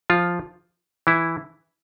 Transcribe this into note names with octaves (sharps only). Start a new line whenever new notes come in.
F3 F4
E3 E4